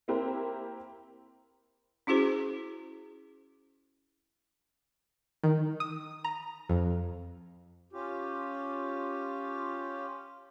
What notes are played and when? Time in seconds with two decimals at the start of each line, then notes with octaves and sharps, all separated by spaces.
0.08 A#3 C4 E4 G4 A#4 C5
2.07 C#4 E4 F#4 G#4 C5
5.44 D#3
5.80 D#6
6.24 A#5
6.69 F2
7.93 C#4 F4 G4